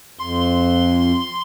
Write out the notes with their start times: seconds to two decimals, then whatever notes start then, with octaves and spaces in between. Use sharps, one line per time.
0.19 F2 C6